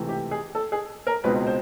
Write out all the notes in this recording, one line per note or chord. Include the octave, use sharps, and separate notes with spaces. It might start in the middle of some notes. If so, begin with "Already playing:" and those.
Already playing: C#2 C3 E3 A3
G4
G#4
A4
G#4
A#4
C#2 B2 G#3 C4 D#4 B4
C5